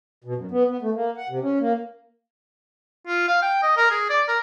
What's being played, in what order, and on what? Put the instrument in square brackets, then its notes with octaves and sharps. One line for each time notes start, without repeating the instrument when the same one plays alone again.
[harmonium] B2
F#2
B3
B3
A3
A#3
F#5
C3
C#4
A#3
[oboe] F4
F5
G5
D#5
A#4
G#4
D5
A#4